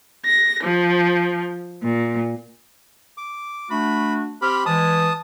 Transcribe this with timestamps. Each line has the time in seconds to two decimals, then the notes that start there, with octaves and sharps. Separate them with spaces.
0.25 A#6
0.64 F3
1.82 A#2
3.17 D6
3.70 A3 D4 F#4 B5
4.42 C4 G4 B5 F6
4.66 E3 G#3 A5 D#6